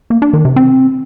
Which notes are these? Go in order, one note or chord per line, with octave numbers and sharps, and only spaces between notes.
A#3
D4
D#3
C3
C4